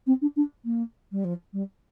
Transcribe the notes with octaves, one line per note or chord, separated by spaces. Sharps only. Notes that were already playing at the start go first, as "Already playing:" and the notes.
C4
D4
D4
A#3
G3
F3
G3